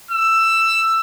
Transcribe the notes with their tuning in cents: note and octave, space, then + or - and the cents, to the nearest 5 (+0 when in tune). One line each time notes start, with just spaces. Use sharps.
E6 +15